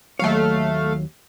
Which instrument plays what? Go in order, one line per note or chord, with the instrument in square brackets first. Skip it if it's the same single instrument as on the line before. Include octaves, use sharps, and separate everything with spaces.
[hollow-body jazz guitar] D#2 F#3 C#5 [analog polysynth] A3 F5